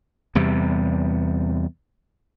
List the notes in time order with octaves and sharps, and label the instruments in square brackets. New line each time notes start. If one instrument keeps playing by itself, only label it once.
[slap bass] E2 C3 G3